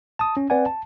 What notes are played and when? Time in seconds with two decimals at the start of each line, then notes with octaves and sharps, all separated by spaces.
0.19 A5 D#6
0.37 C#4
0.50 C4 B4 D5 F#5 G#5
0.66 A5